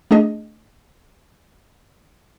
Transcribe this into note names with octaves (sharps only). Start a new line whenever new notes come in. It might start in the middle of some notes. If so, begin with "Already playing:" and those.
A3 D4 G#4 D#5